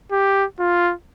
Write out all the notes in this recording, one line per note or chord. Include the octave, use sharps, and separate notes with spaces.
G4
F4